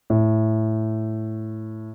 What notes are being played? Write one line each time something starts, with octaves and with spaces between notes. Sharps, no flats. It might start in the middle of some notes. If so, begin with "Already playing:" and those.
A2